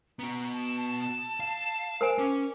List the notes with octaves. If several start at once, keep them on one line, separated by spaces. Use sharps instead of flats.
B3 F#4 A#5
A5
F5
A#4 C5 G#5
C#4 D6